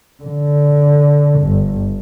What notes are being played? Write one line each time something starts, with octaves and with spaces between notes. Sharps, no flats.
D3
G1